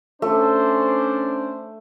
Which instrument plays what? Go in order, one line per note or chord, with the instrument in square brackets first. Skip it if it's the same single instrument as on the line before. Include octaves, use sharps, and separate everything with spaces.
[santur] A3 [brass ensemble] C#4 D4 C5